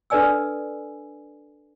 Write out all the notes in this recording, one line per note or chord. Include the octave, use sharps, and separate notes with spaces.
D4 A4 B4 D5 G#5 E6